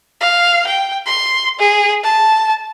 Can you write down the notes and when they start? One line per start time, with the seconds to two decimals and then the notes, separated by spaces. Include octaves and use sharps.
0.21 F5
0.67 G5
1.07 C6
1.60 G#4
2.04 A5